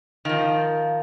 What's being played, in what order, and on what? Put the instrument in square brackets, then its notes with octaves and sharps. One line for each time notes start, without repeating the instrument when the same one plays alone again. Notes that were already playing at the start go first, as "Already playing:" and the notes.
[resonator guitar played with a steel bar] D#3 F3 [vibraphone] A#4 F5